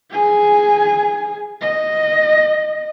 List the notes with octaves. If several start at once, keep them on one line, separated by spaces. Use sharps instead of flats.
G#4 G#5
D#5